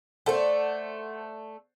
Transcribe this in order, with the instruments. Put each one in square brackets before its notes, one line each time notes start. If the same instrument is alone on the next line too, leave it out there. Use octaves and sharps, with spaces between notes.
[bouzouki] A3 D5 [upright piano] A4 C5 F#5